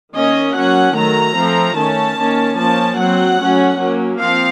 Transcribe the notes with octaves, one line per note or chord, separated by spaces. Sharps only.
D#3 A#3 C#4 D#5
F#3 A#3 C#4 F#5
D#3 F#3 A3 A#5
F3 A3 C4
D#3 A3 C#4 A5
D#3 A#3 C#4
F3 A#3 C#4 A5
F#3 C4 F#5
F#3 A3 C#4
F#3 A#3 C#4
F3 C4 F5